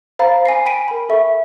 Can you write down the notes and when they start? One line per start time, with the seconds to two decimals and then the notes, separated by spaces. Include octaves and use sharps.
0.19 C5 F5 A#5 B5 A6
0.46 G#5 A#6 C7
0.65 G5 B5 B6 D7 D#7
0.88 A#4 B5
1.09 A4 E5 C#6